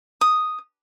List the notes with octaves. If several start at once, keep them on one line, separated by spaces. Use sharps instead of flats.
D#6